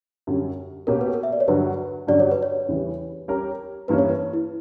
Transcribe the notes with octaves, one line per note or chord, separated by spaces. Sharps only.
F#2 D3 G3 C#4
B2 A#3 C#4 G4 A#4 C#5
B4
A#4
E5
D5
C#5
G2 D3 F#3 B4
G2 D3 F#3 C#4 G4 D5
C#5
B4
C#5
E2 C#3 E3 G3
G3 C#4 G4 A#4 C#5
G2 E3 A#3 C#4 B4
C#5
B4
E4